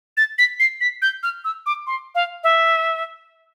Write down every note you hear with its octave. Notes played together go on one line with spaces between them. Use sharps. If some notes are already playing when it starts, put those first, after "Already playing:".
A6
B6
C7
B6
G6
F6
E6
D6
C6
F5
E5